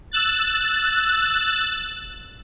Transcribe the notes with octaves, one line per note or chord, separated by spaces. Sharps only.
E6 F#6 A6